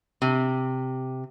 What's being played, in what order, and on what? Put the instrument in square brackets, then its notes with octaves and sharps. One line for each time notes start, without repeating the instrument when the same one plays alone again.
[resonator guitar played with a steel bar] C3